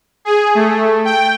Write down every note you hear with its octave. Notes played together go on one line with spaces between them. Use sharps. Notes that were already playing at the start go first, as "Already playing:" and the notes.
G#4
A3
G5